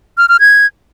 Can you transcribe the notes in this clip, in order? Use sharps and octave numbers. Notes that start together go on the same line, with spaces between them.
F6
F6
G#6